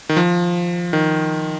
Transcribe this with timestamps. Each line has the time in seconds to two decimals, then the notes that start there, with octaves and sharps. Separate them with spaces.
0.09 D#3
0.16 F3
0.93 D#3